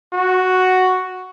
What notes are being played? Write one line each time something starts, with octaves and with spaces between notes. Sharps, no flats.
F#4